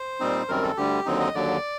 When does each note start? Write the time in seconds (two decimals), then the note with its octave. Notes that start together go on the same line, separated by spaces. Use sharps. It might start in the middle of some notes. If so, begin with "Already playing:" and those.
Already playing: C5
0.20 A#2 G3 C4 D#4
0.48 F#2 D#3 G3 C4 A#4
0.63 A4
0.77 D2 D3 G3 G4
1.06 D#2 D3 F#3 C4 D#4
1.20 D#5
1.35 D#2 D3 F#3 D5